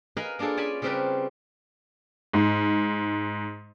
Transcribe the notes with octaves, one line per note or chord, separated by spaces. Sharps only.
A#4 B4 D#5 F5 G#5 B5
A#3 D4 F4 G#4 A4
C#4 D5 G#5 A5 B5
C#3 G3 C4 G4 A#4 B4
G#2